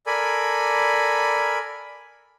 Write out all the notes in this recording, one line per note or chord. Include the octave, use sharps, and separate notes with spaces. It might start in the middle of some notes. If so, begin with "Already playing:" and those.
A4 A#4 D5 G#5 B5